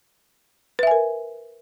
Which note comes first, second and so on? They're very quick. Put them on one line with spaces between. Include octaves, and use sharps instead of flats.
B4 E5 G#5 A#4